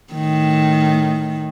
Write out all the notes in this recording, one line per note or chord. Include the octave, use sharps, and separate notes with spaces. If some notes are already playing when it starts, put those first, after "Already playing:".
A2 D#3